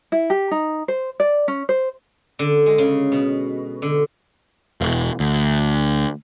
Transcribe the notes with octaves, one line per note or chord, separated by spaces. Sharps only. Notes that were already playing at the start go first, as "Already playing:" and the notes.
E4
G4
D#4
C5
D5
C#4
C5
D3
G#3
C#3
B2
D3
E1
D2